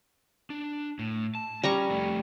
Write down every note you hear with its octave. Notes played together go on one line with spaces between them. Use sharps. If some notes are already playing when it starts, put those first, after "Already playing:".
D4
A2
A5
G3 C#4 A#5 C#6
F2 A3